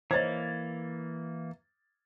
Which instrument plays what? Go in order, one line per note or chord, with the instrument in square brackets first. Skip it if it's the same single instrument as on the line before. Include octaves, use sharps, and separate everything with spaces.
[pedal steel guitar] E3 A#3 [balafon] C5 C#5 D#5 [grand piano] G#6 A6